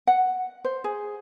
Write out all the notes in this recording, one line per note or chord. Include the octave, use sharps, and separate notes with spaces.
F#5
C5
G#4